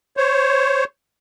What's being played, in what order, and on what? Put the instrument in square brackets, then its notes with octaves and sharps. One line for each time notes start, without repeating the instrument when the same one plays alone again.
[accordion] C5 C#5